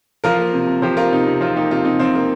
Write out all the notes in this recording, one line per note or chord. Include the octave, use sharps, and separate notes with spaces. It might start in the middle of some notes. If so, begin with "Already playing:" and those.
F3 F4 A#4
A#3
C3
C3
F3 G4 C5
A#3 F4 A#4
C3 D#4
C3 D#4
F3 C4 F4
A#3 D#4 G4
C3 C4 F4
C3 D#4
F3 C4
A#3